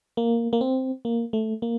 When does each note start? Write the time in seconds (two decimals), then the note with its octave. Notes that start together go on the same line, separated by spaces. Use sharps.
0.17 A#3
0.53 A#3
0.61 C4
1.05 A#3
1.33 A3
1.62 A#3